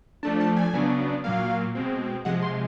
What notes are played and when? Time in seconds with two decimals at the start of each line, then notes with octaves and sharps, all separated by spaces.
0.23 F3 A3 D4 A5
0.40 A5
0.57 G#5
0.73 C#3 F#3 B3 D4
1.24 A#2 F#3 A#3 F5
1.75 B2 G#3 C4
2.25 C3 F3 G#3 F#5
2.42 C6